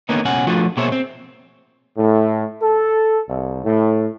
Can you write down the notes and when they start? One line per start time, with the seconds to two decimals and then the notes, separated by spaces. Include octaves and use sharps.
0.09 D3 D#3 A#3 B3 C#4 D#4
0.25 C#2 B2 C#4 F#5 G#5
0.47 F3 G3 A3 D4 F4 F#4
0.77 B2 A#3 G#4 C5 C#5 E5
0.92 C4
1.97 A2
2.62 A4
3.28 C2
3.64 A2